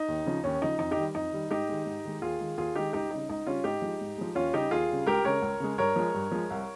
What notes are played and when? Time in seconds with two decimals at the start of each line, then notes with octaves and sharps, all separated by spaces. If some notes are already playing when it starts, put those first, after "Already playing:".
Already playing: D#4
0.08 D#2
0.26 C#3 F3
0.44 D#2 C#4
0.62 C#3 F3 D#4
0.79 F2 D#4
0.91 D#4 G4
0.97 D#3 G3
1.15 F2 D#4
1.32 D#3 G3
1.50 G#2 D#4 G4
1.69 D#3 G#3
1.86 G#2
2.05 D#3 G#3
2.22 D#2 F4 G#4
2.40 D#3 G#3
2.58 D#2 F4 G#4
2.75 D#3 G#3 D#4 G4
2.93 C#2 D#4 G4
3.11 C#3 G3 D#4
3.29 C#2 D#4
3.46 C#3 G3 C#4 F4
3.64 G#2 D#4 G4
3.82 F3 G#3
4.01 G#2
4.18 F3 G#3
4.35 D#2 C#4 F4
4.53 C#3 G3 D#4 G4
4.71 D#2 F4 G#4
4.90 C#3 G3
5.07 C#2 G4 A#4
5.25 C#3 G#3 A#4 C#5
5.42 C#2
5.60 C#3 G#3
5.78 G2 A#4 C#5
5.96 F3 G#3
6.14 G2
6.32 F3 G#3
6.50 C2